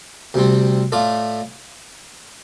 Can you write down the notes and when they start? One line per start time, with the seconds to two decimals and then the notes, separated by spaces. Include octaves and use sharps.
0.34 D2 C3 G3 C4
0.92 A2 A3 F4 A4 D5